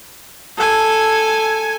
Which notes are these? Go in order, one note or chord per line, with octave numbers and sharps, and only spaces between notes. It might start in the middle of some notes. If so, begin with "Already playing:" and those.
A4 G#5